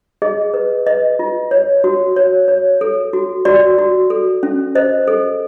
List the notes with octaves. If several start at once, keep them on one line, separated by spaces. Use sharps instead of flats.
G#4 D#5
B4
B4 D#5
F4
C#5
F#4
C#5
C#5
A4
F#4
F#4 D5
F#4
A4
C#4
C5 D#5
A4